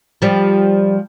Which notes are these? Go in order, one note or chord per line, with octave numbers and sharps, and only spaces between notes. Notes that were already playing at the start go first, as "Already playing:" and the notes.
F3 G3